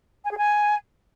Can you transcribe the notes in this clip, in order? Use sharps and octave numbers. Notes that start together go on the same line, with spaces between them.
G#5
G#4
G#5